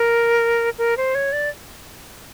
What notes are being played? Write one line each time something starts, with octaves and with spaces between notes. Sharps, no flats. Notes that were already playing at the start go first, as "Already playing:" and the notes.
Already playing: A#4
A#4
C5
C#5
D5